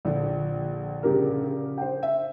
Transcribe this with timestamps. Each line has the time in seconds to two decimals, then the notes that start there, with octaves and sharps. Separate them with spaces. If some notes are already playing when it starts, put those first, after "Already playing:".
0.05 A#1 D3 F3
1.03 C#3 G4 A#4
1.78 C5 G5
2.03 E5